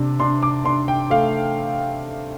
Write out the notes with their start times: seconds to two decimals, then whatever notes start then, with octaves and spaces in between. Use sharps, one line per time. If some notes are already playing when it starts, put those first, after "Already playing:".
Already playing: C3 D4
0.20 D4 C6
0.43 D6
0.65 D4 C6
0.88 G5
1.10 A3 F5